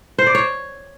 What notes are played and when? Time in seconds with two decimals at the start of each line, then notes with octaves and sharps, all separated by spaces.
0.18 C5
0.27 D5
0.35 C#5